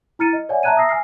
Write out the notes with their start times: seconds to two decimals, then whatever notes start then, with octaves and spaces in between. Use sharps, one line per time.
0.19 E4 A#5 F6 A6 C#7 D#7
0.33 D#5
0.49 C#5 D5 E5 F#5 G#5
0.63 E5 A5 A#5 F#6 G#6 D#7
0.76 E5 A#5 D#6 E6 A#6 C7
0.89 G#5 F6 C7